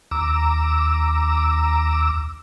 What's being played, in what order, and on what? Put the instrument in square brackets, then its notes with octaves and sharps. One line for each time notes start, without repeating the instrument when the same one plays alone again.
[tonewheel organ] D#2 A#5 D6 E6